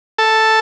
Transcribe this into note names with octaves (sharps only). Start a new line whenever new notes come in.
A4